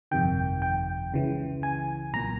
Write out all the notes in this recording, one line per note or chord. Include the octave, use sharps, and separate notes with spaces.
G1 F2 C3 D#3 G5
G5
C#2 C#3 E3
G#5
B1 A#2 A#5